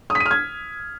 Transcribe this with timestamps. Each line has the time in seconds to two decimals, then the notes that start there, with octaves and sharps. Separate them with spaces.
0.10 D#6
0.15 B6
0.20 D#7
0.26 F6
0.31 G#6